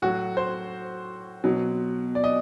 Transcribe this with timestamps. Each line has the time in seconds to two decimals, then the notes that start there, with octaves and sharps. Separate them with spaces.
0.02 A2 F#3 F#4
0.37 C5
1.44 B2 F#3
2.15 D5
2.24 D#5